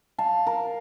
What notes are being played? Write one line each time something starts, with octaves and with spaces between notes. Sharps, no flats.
F5 A5
A#4